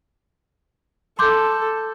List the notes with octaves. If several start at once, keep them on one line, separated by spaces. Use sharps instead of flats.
A4 C6 D6 G6